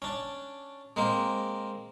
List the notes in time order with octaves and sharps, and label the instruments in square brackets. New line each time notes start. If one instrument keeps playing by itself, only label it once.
[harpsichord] C#4 D4
G#3 A#3 C4